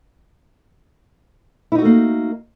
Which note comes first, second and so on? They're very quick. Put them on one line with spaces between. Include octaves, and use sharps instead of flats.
E4 D#4 F#4 A3 A#3